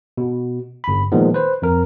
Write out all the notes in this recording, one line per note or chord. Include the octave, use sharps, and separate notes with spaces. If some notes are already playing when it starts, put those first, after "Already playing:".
B2
G1 B5
A#2 D#3 F3 G#3 B3
B4 C5
F2 A#4